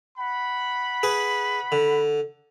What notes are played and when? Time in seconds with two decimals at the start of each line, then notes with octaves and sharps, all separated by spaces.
0.17 F#5 B5
1.03 G#4 B4
1.72 D3